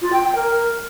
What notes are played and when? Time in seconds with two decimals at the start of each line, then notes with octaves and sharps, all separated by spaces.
0.01 F4
0.12 G5
0.24 G5
0.35 A#4